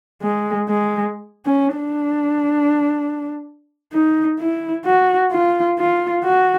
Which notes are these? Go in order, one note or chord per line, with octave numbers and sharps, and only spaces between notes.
G#3
G#3
C#4
D4
D#4
E4
F#4
F4
F4
F#4